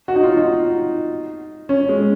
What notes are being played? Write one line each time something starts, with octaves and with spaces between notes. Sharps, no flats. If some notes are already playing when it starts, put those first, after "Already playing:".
F#4
D#4
F4
D#4
C#4
G#3